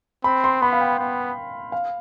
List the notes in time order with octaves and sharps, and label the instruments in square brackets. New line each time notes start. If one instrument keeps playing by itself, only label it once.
[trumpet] C4 [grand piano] B5
[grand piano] C6
[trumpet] B3 [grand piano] B5
[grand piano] F5
G5
[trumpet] B3
[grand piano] F5